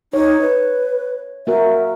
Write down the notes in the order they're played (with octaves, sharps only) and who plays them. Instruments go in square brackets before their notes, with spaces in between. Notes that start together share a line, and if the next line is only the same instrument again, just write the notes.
[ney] D#4 [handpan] C#5
[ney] B4
[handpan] A#3 F#4 A#4 [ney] E5